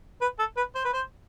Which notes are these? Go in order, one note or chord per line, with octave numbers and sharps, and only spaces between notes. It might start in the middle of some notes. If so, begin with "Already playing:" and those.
B4
A4
B4
C5
B4
C5